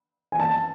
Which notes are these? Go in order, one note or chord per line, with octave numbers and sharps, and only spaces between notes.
G#5
A5